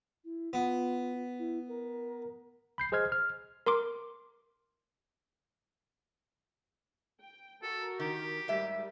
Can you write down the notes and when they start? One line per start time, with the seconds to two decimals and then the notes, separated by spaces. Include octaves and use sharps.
0.25 E4
0.53 B3 F4
1.39 E4
1.68 A#4
2.78 B5 G6 C7
2.92 G#4 C5 D#5 F6 G#6
3.12 F6
3.66 A#4 C6 D6
7.22 G5
7.62 F#4 A4 A#4
7.99 D#3 G4
8.48 G#2 G3 A3 A#4 E5